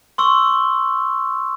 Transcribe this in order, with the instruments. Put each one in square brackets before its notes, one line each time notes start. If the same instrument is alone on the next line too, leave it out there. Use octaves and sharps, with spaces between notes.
[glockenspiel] C6 C#6 E6